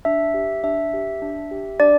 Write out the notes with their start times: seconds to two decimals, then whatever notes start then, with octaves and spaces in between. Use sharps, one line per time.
0.05 D4 E5
0.34 G4
0.63 D4 E5
0.94 G4
1.22 D4
1.51 G4
1.80 D4 D5